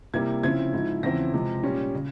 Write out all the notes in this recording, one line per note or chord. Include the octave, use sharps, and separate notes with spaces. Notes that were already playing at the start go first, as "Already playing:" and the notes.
C3 G3 A#3 E4 G#6
C#3 F3 C4 E4 G#6
G#2 F3 G#3 E4
E2 C#3 F3 C4 E4 A#6
C3 F3 G#3
A#2 G3 C#4
C#3